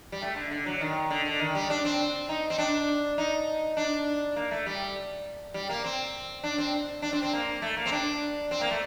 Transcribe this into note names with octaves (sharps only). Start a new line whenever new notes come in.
G3
A3
D3
D3
F#3
D#3
D3
D3
D#3
G3
D4
C4
D#4
C4
D4
D#4
D4
A#3
A3
G3
G3
A#3
C4
D4
C4
D4
C4
C4
A#3
A3
A#3
C4
D4
C4
A#3
A3